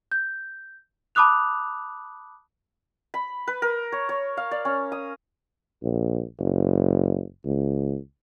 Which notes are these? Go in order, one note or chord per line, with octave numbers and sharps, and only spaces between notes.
G6
A5 B5 D6 D#6 F#6 F7
B5
B4
A#4
C#5
C#5
F5
D5
C#4
D#6
A#1
F#1
C#2